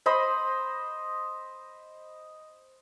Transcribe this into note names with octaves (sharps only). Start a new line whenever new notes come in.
C5 D#5 B5 C6